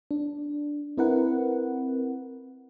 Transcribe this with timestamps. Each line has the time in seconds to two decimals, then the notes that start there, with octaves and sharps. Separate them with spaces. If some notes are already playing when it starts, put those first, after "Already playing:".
0.11 D4
0.97 C4 E4 A#4 B4 F#5